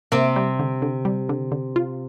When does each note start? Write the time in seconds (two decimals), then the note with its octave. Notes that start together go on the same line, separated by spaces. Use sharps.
0.12 C3 A#3 C4
0.36 G3
0.59 D3
0.82 D3
1.05 G3
1.29 D3
1.52 D3
1.76 F4